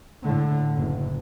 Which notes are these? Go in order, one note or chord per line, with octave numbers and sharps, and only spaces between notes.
A2 D3
F#1